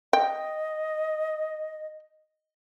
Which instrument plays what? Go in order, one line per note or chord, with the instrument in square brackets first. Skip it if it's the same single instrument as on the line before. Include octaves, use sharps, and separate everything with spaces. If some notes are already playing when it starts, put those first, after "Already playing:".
[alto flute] D#5 [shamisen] G5